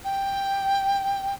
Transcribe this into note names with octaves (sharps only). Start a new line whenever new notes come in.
G5